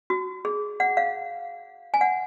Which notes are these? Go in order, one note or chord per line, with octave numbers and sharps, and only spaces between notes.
F#4
G#4
F#5
F5
G#5
F#5